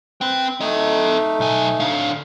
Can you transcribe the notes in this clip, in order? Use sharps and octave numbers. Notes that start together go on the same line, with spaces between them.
C4 B4 G5
A3 D#4 A4 D#5
B1 G#5
D3 F5